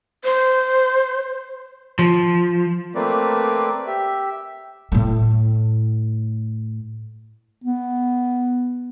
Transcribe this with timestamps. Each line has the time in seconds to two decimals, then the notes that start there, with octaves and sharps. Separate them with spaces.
0.24 C5
1.99 F3
2.95 A3 A#3 C4 B4 D5
3.87 G4 E5
4.92 A2 A3
7.64 B3